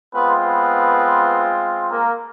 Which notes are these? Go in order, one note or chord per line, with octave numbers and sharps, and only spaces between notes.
G#3 B3 C4 F4 B4
B3 B4
A#3 A#4